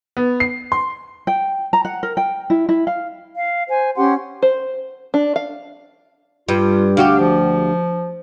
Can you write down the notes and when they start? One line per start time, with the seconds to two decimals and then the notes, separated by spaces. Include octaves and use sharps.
0.17 B3
0.40 C7
0.72 C6
1.27 G5
1.73 A#5
1.85 F#5
2.03 A#4
2.17 G5
2.50 E4
2.69 E4
2.87 F5
3.35 F5
3.67 C5 G#5
3.96 C#4 G4 F#5 C6
4.42 C5
5.14 D4
5.36 F5
6.49 G2 F4
6.97 D2 F#4 G4 F5
7.19 F3